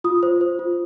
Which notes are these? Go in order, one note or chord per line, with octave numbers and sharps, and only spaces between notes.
F4 D#6
C5
C5
F4